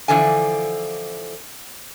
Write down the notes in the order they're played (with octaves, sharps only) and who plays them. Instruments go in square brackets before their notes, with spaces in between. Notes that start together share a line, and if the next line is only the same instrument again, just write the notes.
[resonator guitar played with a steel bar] D3 E3 F3 A4 G#5